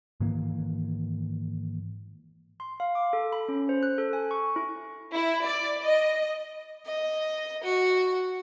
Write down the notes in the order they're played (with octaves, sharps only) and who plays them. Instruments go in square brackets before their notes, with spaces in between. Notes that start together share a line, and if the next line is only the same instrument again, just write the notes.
[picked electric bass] G#2 D#3 E3 A#3
[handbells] C6
F5
D6
A4
B5
C#4
C5
F#6
A4
G#5
C#6
E4
[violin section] E4
D5
D#5
[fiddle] D#5
F#4